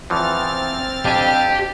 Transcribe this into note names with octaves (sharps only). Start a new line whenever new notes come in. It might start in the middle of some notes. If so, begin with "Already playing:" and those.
E2 E3 F3 C4 F6 A6
F2 D4 G4 G#5